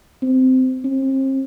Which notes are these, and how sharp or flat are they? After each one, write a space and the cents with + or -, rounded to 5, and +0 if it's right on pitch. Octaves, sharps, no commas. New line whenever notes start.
C4 -15
C4 +35